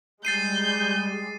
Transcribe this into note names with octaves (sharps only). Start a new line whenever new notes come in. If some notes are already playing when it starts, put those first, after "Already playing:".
G3 G#3 G6 A6 C7 D#7